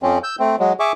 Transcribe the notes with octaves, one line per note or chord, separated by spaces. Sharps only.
F2 F3 C4 C#4
E6 G6
A3 C4
F#3 G#3
G#4 E5 C#6 D6